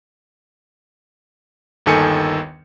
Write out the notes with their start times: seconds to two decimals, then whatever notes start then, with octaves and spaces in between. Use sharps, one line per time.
1.86 G1 D#2 D#3 A4 G#5 C#7